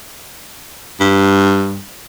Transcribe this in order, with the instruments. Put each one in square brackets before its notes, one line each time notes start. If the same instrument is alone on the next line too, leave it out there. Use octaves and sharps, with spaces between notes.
[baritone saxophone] G2